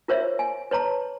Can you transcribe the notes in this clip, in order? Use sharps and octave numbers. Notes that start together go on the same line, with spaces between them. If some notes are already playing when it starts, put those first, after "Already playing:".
F4 A#4 C5 C#5 E5
G#5
B4 C#5 A5 A#5